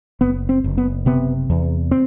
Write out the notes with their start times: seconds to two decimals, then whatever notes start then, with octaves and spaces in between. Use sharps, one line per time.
0.21 F#1 B3
0.49 C4
0.64 F#1
0.78 B3
1.06 C3 B3
1.50 E2
1.91 C4